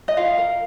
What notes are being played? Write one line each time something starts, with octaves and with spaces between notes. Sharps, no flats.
D#5
F4 F5
A#4